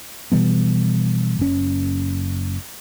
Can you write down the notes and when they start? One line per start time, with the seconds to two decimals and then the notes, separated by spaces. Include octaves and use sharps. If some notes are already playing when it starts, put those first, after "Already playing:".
0.32 B2 E3 G3 B3
1.39 F#1 C#4